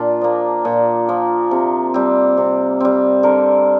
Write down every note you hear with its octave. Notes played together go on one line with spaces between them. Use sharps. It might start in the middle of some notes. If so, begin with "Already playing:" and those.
Already playing: A#2 D4 F4
F3 A#3
A#2
F3 A#3
C3
G3 C4
C3
G3 C4
D3 A#4